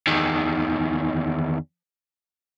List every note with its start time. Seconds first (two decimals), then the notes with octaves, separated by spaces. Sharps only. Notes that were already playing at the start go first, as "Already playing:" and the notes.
0.07 E2 D#3